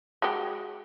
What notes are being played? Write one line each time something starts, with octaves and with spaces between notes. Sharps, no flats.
G#3 F#4 G4